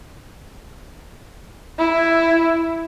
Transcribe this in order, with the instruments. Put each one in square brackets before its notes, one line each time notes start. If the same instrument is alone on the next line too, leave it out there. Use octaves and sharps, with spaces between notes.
[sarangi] E4